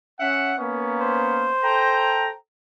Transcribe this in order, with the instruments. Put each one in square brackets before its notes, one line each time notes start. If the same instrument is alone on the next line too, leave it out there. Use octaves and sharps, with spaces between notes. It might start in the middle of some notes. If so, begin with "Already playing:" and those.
[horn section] C#4 E5 F#5
A#3 B3 C#4
[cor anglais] C5
[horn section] A4 G5 A#5